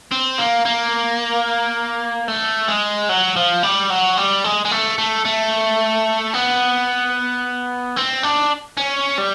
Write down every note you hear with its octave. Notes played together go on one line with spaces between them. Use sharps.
C4
A#3
A#3
A3
G#3
F#3
F3
G3
F#3
G3
G#3
G#3
A3
A3
A3
B3
C4
D4
C#4
G3